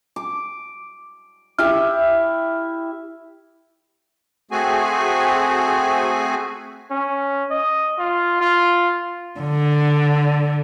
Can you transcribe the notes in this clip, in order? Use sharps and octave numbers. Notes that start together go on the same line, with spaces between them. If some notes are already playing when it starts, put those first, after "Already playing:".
D6
E4 G4 E5 F6
A3 C4 F#4 G#4 G#5
C#4
D#5
F4
F4
D3